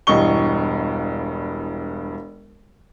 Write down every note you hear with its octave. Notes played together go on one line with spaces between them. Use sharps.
E1 G2 E3 D#5 C#6 G7